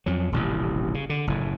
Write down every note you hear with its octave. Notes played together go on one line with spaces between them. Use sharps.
F2 F#3
D#1 A1 C3
C#3
D3
F#1 A2